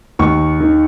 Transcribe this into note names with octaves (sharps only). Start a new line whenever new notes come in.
D#2 C#6
D#3